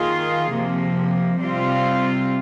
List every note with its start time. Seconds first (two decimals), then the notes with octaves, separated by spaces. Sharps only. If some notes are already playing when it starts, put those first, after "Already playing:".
Already playing: D#3 A#3 F4 G#4
0.51 C3 F3 A#3
1.39 C3 G3 C4 F4